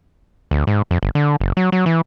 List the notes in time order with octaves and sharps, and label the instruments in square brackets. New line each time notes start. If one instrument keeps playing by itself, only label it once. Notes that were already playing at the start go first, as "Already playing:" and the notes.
[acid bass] D2
G#2
F2
G1
D3
F#1
F#3
F#3
E3